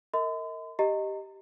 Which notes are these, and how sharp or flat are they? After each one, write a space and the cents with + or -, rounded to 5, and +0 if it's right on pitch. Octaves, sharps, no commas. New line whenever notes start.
A#4 -25 D#5 +40 C6 -45
G4 +0 D#5 +0 A#5 -25